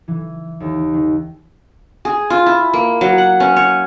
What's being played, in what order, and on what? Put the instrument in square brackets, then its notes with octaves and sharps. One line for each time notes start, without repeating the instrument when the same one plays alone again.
[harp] E3
D#2
D#3
[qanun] G#4
F4
E4
A#3
F#3
F#5
C#4
C#5